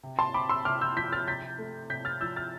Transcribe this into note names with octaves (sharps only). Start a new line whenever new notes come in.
C3
A5 C6
C4 B5 D6
C6 E6
C3 D6 F6
E6 G6
F3 G6 B6
F6 A6
C3 G6 B6
A3
C3 G6 B6
F6 A6
F3 E6 G6
F6 A6